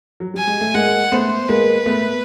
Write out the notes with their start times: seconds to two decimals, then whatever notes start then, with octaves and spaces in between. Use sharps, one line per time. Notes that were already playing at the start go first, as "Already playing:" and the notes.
0.20 F#3
0.34 G3 G#5
0.47 G#3
0.61 A3
0.74 G#3 A#3 F#5
1.12 A3 B3 C5
1.49 G#3 A#3 B4
1.86 A3 B3